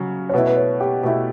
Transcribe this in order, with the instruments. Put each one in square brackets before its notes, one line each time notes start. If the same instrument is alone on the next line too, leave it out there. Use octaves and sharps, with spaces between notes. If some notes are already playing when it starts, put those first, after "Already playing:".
Already playing: [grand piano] C#3 F#3 C#4
[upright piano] C#5
[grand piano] B2 A3 E4 [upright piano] B4
[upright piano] B4
C#5
G4
[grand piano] B2 A3 E4